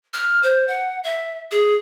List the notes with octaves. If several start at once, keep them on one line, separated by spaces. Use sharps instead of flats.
F6
C5
F#5
E5
G#4